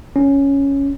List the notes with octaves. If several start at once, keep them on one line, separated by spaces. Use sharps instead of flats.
C#4